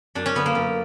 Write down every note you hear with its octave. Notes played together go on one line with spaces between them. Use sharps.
F#2 D4
C#4
D3 B3
A#3
F#2